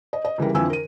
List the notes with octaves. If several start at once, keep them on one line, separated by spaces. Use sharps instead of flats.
D#5
D#5
C#2 E3 G3 A#4
F2 D3 E3 F3 G#5 E6
A#4 D#7